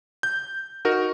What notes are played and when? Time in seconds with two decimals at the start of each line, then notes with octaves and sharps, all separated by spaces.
0.23 G6
0.85 D#4 F#4 A#4